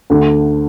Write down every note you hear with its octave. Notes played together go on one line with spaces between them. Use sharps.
D2 D3